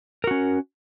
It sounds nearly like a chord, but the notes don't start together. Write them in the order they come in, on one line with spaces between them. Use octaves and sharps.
A#4 F#4 C#4